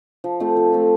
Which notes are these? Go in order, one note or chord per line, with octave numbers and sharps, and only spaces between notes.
F3
A3 C4 F4
F3
A3 C4 F4